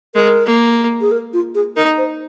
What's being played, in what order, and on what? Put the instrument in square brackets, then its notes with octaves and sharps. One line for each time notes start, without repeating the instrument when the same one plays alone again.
[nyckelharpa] G#3 [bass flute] A#4
[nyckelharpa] A#3
[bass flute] G#4
A#4
F4
G#4
[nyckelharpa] D#4 [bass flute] A#4
[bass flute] C5